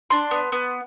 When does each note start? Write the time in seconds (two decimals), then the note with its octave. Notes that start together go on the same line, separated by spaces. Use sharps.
0.10 D4 C6
0.31 B3
0.52 B3